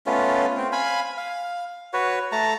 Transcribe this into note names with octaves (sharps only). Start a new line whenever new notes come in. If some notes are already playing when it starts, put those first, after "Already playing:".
A3 B3 C#4 F4
C4
F5 G#5 B5
F5
F#4 B4 C#5
A3 A5 A#5